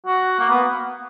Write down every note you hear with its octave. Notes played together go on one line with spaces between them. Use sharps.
F#4
A#3
B3